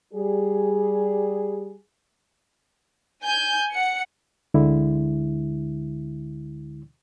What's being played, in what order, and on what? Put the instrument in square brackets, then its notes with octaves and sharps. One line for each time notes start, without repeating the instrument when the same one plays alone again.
[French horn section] G3 G#4
[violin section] G#5 G6
F#5 C#7
[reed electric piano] D2 D3 G#3 E4